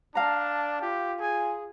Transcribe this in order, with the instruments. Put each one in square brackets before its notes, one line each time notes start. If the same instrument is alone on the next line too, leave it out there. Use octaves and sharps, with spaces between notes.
[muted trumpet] D4 [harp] F5 A#5 [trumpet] A5
[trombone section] F4 [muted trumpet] G4
[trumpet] G#4 [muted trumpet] G#5